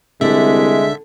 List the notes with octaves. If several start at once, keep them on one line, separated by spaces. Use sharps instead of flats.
C2 D3 G#3 E5